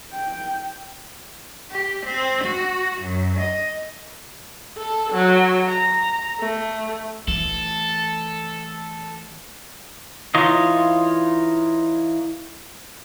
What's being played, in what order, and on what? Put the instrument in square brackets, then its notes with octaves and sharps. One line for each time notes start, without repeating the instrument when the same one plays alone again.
[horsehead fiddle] G5
[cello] G4
C4
F#4
F#2
D#5
[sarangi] A4
F#3
A#5
A3
[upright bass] E3 A3 [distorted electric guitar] A4
[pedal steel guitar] E3 D#4 F4 C#5 D#5